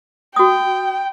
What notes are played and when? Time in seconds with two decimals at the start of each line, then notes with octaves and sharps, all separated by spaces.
0.36 F#4 G5 D#6